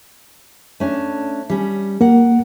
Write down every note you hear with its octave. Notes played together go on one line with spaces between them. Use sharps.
A3 C#4 D4
G3 C#4
A#3 A#4 F#5